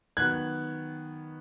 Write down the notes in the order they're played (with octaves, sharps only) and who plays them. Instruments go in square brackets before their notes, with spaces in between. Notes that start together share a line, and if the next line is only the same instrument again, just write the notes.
[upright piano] D#3 F#3 B3 [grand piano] F#6 G#6